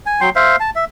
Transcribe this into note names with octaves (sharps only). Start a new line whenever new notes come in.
G#5
F#3 G5 C6
C5 E5 F5
A5
E5